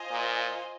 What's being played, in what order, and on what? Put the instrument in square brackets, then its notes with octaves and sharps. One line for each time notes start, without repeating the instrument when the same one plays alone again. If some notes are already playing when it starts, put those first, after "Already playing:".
Already playing: [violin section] F4 C5 D#5 G#5
[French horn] A#2